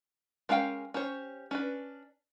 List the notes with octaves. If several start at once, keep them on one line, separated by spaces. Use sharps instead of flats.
G#3 C#4 A#4 F5 G5
C#4 G4 C5 C#5
C#4 D4 B4